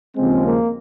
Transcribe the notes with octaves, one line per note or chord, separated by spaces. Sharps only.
D#2 C#3 F3 G#3 C4
A#3